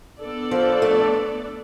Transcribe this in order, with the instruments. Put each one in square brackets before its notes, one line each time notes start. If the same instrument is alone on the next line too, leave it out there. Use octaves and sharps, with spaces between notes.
[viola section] B3 D4 A4 D5
[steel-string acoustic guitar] F3
A3